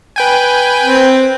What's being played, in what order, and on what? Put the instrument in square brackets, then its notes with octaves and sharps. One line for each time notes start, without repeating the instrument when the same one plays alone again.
[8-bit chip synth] B4 G5 G#5
[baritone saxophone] C4